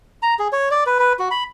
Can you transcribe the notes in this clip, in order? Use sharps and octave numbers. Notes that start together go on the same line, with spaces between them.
A#5
G#4
C#5
D5
B4
B4
F#4
B5